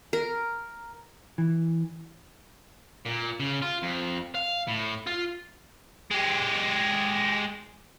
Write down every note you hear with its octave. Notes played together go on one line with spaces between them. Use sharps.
A#4
E3
A#2
C#3
F4
F2
F5
A2
F4
G#3 G4